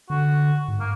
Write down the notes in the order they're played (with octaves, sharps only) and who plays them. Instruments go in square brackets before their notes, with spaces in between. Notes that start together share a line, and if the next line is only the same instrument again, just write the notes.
[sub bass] D3 [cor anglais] F#4
[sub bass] G#2
[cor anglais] A#3